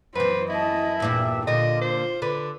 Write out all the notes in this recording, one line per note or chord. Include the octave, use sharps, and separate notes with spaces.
F#2 E3 B4 C5
E4 D#5 A5
E2 G2 A#2 E5
A#2 D3 F4 D#5
C5
D3 B4